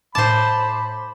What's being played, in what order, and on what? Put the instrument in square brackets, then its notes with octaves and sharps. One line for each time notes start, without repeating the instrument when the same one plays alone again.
[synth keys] A2 D6 [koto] C5 A5 [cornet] B5